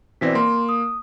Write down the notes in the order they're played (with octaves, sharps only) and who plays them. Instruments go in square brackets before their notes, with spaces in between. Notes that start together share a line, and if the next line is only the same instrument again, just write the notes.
[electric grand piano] B2 E3 C4 [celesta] D5 A#6 B6
[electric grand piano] A#3 [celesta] C6
[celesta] D#6